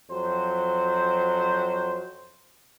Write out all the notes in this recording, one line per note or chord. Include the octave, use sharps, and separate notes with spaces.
F2 F#3 C5